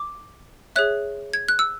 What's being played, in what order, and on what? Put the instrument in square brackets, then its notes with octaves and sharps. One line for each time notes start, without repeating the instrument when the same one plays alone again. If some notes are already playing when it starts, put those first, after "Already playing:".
Already playing: [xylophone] D6
G#4 C#5 E5 F#6
G#6
F#6
E6